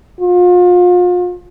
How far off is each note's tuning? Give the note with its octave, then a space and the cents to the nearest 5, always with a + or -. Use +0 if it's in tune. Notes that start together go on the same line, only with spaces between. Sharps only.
F4 +35